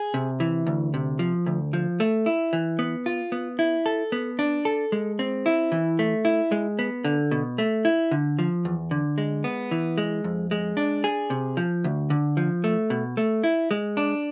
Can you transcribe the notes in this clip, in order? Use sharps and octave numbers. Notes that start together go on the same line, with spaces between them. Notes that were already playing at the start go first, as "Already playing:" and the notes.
Already playing: G#4
C3
E3
D2
C3
F3
D2
F3
A3
E4
E3
B3
F4
B3
E4
A4
B3
D4
A4
G#3
C4
E4
E3
A3
E4
G#3
B3
D3
B2
A3
E4
D3
F3
E2
D3
G#3
B3
E3
G#3
F2
G#3
D4
G#4
C3
F3
D2
D3
F3
A3
B2
A3
E4
G#3
D4